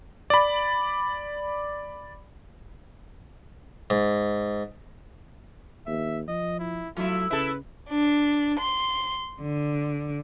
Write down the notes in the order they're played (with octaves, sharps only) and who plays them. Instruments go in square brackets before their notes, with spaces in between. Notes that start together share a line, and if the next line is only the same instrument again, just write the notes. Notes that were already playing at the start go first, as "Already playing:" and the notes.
[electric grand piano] D5 B5
[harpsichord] G#2
[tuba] D#2 [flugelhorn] E5
[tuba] F3 [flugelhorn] D#5
[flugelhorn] E4
[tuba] F#3 [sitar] A3 E4 [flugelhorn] F4
[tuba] C#3 [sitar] E4 A4 [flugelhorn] B4
[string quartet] D4
C6
D3